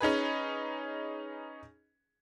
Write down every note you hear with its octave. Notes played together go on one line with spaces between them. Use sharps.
C#4 D#4 G#4 B4